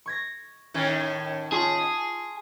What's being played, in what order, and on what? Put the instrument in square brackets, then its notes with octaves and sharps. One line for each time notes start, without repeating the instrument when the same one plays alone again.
[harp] C#6 G#6 A#6
[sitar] A2 D#3 C#4
[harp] F4 A5 C#6 [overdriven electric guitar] G#4